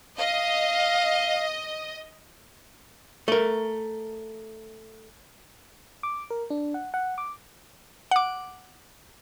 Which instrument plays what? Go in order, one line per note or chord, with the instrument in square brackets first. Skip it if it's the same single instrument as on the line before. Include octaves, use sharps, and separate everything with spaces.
[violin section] D#5 [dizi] F5
[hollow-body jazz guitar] A3 A#4
[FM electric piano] D6
A#4
D4
F#5
F#5
D6
[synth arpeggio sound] F#5 D6